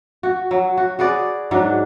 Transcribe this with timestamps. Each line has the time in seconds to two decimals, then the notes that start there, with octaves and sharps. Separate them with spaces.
0.23 F#4
0.51 F#3
0.77 F#4
0.99 F#4 G#4 B4 D5
1.51 G#2 F#3 D4